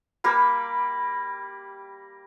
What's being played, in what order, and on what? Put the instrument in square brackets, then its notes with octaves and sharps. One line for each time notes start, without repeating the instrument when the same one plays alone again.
[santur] G3 A#3 B5